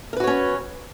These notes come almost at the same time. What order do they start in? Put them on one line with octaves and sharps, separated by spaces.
A#4 B4 F#4 C#5 C#4